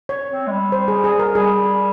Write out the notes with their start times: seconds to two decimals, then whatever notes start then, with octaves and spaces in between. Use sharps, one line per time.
0.09 C#5
0.31 C4
0.47 G#3
0.51 G3
0.72 C5
0.88 G#4
1.04 G#4
1.19 A#4
1.35 G3 G#4